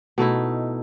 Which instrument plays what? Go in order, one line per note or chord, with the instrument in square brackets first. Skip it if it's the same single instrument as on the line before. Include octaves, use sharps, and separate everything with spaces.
[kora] B2 A3 D#4 E4